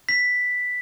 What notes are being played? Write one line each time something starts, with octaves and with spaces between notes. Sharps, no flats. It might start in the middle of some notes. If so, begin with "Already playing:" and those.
B6